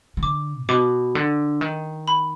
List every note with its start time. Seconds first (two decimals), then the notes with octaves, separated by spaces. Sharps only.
0.17 D#3
0.22 D3 D6
0.63 G#2
0.69 B2 D6
1.15 D3
1.61 D#3
2.08 B5